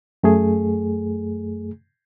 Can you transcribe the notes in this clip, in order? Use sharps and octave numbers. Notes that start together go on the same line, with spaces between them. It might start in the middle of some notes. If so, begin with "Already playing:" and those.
F#2 A3 G#4